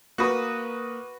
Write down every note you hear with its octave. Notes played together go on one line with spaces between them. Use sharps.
A#3 F#4 B4 D#6